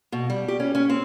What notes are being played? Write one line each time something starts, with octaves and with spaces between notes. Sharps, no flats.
B2
G3
G4
C#4
C#4
C4